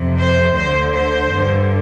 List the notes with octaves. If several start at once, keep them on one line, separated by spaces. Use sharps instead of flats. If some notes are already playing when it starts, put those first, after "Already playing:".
Already playing: F2 C3
C5
D2 D3 C5
C5
G2 D3